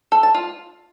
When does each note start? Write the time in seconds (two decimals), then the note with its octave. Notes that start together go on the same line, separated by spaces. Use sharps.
0.12 A4
0.23 A5
0.35 F4